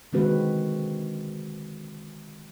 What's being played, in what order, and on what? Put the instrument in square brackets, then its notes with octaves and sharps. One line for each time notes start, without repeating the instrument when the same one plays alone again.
[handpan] D3 D#3 G#3 C4 F#4 B4